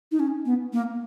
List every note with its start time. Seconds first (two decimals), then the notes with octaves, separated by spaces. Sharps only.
0.12 D#4
0.20 C#4
0.46 B3
0.73 A#3